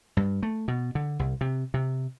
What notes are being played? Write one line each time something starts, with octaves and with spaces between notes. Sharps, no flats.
G2
A3
B2
D3
C2
C3
C3